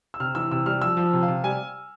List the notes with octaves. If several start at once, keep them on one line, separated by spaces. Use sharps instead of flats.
E6
C3 F6
E3 E6
C3 E6
G3 F6
F3 E6
F3
C3
F5
C3
G3 G#5